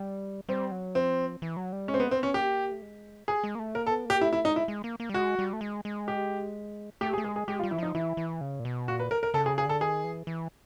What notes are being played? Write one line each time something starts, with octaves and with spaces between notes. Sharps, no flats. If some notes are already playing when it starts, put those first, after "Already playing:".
Already playing: G3
G3 C4
F#3
F3 C4
E3
F#3
G3
G#3 C#4
C4
B3
A#3
B3 C4
C#4
A#3 G4
A3
G#3
G#4
G#3
A#3
A3
A#3 A#4
A4
B3
A#3 G4
A3 E4
E4
G#3 D#4
E4
G#3
A#3
A#3
G3
G#3 F#4
G3
A3
G#3
G#3
G4
A3 G4
G#4
A3
G#3 G#4
G#4
G#3 G4
F4
G3
E3 E4
F3 D#4
E3 E4
E3
C#3
A#2
B2
A#2 F#4
B4
A#4
A#4
C#3 A4
C3 G#4
C#3
G#4
D3 A4
D#3 G#4
E3
E3